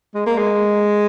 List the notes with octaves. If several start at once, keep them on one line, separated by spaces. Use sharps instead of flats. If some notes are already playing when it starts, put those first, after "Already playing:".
G#3
A#3
G#3